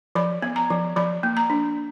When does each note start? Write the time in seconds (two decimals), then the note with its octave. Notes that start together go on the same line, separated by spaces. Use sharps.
0.15 F3 B5
0.42 B3
0.56 A#5
0.70 F3
0.96 F3 B5
1.23 A#3
1.37 A#5
1.50 D4